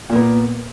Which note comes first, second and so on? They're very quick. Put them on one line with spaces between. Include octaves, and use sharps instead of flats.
A#2 A#3 B3